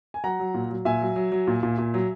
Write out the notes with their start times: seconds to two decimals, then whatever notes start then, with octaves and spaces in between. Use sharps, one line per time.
0.14 G#5
0.24 F#3 F#5 A#5
0.40 F#3
0.54 A#2
0.70 F#3
0.85 A#2 E5 G#5
1.01 F#3
1.16 F#3
1.32 F#3
1.47 A#2
1.63 A#2
1.78 A#2
1.94 F#3